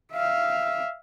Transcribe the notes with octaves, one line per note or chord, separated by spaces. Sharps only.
E5 F5